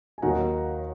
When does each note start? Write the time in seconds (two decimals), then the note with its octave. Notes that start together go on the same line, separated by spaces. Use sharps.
0.18 G#5
0.22 D#2 D#3 F#3 F#5 A#5